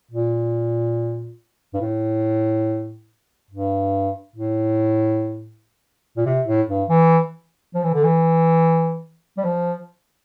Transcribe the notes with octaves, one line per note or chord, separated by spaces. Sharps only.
A#2
G2
A2
G2
A2
A#2
C3
A2
G2
E3
F3
E3
D3
E3
G3
F3